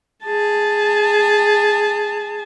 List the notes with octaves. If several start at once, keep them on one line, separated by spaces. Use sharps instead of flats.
G#4 A5